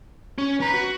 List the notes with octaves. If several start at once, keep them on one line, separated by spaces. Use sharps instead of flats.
C#4
C#4 B4 A#5
F#4